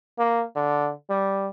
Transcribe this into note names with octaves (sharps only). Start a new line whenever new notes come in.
A#3
D3
G3